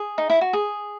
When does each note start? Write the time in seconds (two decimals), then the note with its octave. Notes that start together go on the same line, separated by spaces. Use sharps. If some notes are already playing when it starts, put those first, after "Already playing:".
Already playing: G#4
0.18 D#4
0.30 E4
0.41 F#4
0.53 G#4